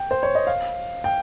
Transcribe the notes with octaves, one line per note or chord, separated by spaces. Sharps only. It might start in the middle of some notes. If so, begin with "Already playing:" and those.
Already playing: G5
C5
C#5
D#5
F5
G5